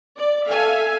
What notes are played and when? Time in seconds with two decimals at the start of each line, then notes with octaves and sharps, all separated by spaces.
0.17 D5
0.49 A4 E5 F5 G#5